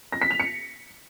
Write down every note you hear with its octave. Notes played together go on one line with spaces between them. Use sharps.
A#6
B6
F7
C#7